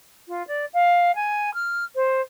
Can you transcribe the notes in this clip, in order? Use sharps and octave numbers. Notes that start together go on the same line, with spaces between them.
F4
D5
F5
G#5
F6
C5